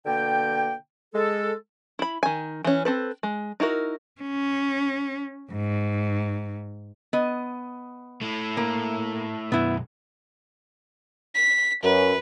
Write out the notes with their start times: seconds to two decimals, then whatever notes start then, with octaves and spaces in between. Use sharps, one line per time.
0.06 B2 D3 A#3 G5
1.14 G#3 A4
1.99 E4 B5
2.23 D#3 G#5
2.64 E3 C#4
2.85 C4 A4 B4
3.23 G#3
3.60 D#4 E4 F#4 A#4
4.21 C#4
5.51 G#2
7.13 B3 D#5
8.22 A3 E4
8.57 A#3
9.52 B1 F#2 B3 E4
11.34 B6
11.83 F#2 B4